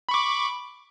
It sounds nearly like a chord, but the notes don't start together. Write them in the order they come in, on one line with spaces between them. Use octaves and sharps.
B5 C#6 D6